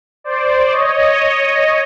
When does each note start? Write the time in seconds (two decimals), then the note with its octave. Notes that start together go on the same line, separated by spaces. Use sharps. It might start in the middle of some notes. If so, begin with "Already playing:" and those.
0.24 C5 D5
0.71 C#5 D#5